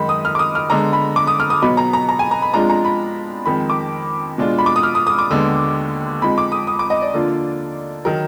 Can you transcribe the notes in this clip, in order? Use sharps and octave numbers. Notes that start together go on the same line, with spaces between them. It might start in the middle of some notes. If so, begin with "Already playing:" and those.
Already playing: F#2 D#3 G#3 D#4 B5
D#6
F6
D6
D#6
F6
D3 G#3 B3 A#5
B5
D6
D#6
F6
D#6
B2 F#3 B3 D#4 B5
A#5
A#5
A#5
G#5
A#5
B5
F2 F3 G#3 D4 F4 A#5
A#5
B5
F2 D#3 G#3 B5
D6
B2 G#3 D4 F4
B5
D6
D#6
F6
D#6
D#6
D6
D#2 D3 G#3 B3
F2 F3 G#3 D#4 B5
D6
D#6
D#6
D6
D#5
D5
D3 F3 A#3 D4 F4
D#3 F#3 A#4